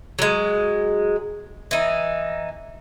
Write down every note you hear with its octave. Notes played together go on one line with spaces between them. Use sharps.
F#3 G#3
E3 D#4